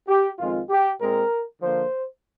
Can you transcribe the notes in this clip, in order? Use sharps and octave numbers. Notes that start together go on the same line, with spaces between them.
G4
F2 D#3 G#3 C4 F4
G4
A#2 G#3 C4 A#4
D3 F3 A#3 C5